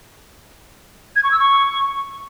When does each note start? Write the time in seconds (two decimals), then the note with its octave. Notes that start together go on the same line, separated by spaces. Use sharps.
1.16 G#6
1.24 C#6
1.32 E6
1.39 C#6